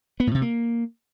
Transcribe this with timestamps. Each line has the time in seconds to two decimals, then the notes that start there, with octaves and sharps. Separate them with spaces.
0.20 B3
0.27 A2
0.35 C3
0.42 A#3